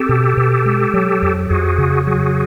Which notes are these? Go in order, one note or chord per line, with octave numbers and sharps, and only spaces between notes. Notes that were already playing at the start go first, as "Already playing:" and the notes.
Already playing: C4 G4 A4
B2
B2
G#3
F#3
F2
F2 F#4 G#4
C#3
F#3 F#4 G#4